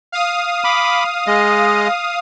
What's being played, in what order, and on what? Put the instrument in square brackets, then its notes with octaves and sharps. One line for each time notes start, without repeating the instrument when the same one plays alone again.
[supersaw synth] F5 D#6
[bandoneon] B5 D6
G#3 D#5